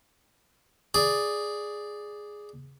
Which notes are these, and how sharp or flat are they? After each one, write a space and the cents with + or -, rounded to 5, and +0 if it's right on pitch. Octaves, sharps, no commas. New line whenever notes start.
G#4 +0 D5 +0